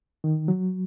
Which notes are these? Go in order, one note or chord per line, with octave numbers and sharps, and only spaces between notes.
D#3
F#3